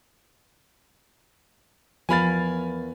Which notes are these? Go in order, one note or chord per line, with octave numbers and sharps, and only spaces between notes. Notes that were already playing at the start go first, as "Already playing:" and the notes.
E2 F3 A#4 F5 G#5 B5 A6